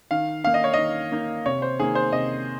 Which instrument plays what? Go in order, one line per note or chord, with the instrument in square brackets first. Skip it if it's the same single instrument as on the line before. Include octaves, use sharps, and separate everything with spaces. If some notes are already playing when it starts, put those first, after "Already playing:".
[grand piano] D#3 F5
A#3 D#4 F5
D#5
C#5
D#3 D#5
A#3 D#4
C3 C#5
C5
D#3 A#3 G#4
C5
C3 D#5